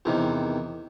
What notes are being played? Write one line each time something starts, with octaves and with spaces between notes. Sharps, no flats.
E2 C3 D#3